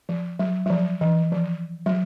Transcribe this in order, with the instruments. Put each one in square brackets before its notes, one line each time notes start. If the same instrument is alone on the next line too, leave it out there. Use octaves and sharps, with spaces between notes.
[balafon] F3
F#3
F#3
F3
E3
F3
F#3